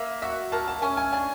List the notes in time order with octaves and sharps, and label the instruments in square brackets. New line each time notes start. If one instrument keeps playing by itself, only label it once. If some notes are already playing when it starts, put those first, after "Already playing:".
Already playing: [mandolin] A#3 [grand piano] E5
[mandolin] F#4 [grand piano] E5
[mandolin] A#3 [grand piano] A5
[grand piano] A5
[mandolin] C#4 [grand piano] G#5
[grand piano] G#5
[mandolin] D4 [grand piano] G#5